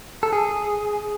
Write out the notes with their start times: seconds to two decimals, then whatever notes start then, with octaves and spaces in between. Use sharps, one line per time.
0.23 A4
0.33 G#4